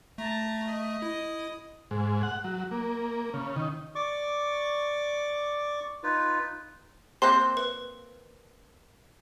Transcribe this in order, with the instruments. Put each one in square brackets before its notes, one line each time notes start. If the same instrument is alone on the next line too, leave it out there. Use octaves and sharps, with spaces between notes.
[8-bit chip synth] A3 [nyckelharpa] A5 A#5
[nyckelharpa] D#5
[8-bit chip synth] E4
[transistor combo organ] G#2
F#5
F#3
A#3
C#3
D#3
[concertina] D5 C#6 D6
D#4 F4 B4
[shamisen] A#3 C4 C5 [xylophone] C6 F#6
[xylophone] B4